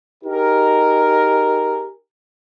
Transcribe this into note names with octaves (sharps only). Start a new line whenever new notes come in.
D#4 G4 G#4 A#4